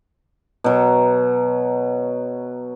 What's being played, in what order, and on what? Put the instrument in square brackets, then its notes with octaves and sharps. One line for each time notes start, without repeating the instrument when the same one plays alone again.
[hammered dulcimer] B2 F#3